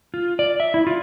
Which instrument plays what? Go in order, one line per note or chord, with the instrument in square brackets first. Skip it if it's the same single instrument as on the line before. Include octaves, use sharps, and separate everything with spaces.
[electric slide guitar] F4
D5
E5
E4
F4